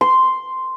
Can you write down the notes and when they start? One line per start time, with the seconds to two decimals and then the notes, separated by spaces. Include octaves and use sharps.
0.01 C6